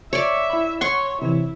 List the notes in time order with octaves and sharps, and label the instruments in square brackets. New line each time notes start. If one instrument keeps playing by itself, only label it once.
[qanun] C#5 D5 [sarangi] E5
[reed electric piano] E4 B5
[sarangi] C#5 [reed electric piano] F#5 G#6 [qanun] C6 C#6
[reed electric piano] C3 E3 C#5 [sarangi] E4